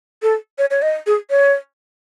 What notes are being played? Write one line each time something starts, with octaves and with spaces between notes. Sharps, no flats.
A4
C#5
C#5
D#5
G#4
C#5